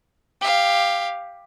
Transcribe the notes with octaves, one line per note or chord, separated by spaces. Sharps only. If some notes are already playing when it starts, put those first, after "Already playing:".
G4 F5